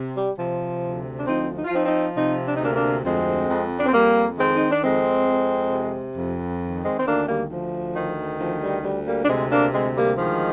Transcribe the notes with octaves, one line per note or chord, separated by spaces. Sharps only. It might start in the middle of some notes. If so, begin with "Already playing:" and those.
Already playing: C3
G3
C3 F3
D2
D4
F3 C4 D#4
D#4
F4
F3 C4 D#4
C4 D#4
C3 C4 D#4
D4
D#4
D2 A#3 D4
A#3 D4
F2 G#3 C4
F2
D4
C4
F2 G3 A#3
D#3 G#3 C4
D#4
D4
F2 G#3 C4
F2
C3
F2
D#3
G#3 C4
C4
D2 A#3 D4
G3 A#3
D2 F3
D#3
D2 F3
G3
D2 G3
G3 A#3
D4
C3 G#3 C4
A#3 D4
D2 G#3 C4
G3 A#3
D#3 F3 G#3